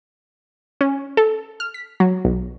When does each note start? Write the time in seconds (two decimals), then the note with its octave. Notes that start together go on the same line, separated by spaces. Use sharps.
0.81 C#4
1.17 A4
1.60 F6
1.74 B6
2.00 F#3
2.25 B1